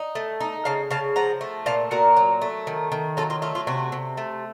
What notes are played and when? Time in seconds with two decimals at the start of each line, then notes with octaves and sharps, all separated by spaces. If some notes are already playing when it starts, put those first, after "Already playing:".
Already playing: D#4
0.15 A3
0.40 D#4
0.65 C#3 F5 A5
0.91 C#3 F5 A5
1.16 F3 F#5 A#5
1.41 A3
1.66 A#2 F5 A5
1.91 A#2 F#4 A#4
2.17 F#3
2.42 A3
2.67 D#3
2.92 D#3
3.17 F#3 F4 A4
3.30 F4
3.42 A3 F4
3.55 F4
3.67 C3 F#4
3.92 C3
4.17 A3